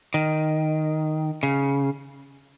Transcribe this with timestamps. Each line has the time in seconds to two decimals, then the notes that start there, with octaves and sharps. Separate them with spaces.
0.14 D#3
1.43 C#3